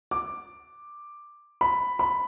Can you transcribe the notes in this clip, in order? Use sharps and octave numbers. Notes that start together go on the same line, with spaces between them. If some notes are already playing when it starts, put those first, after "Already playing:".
D6
B5
B5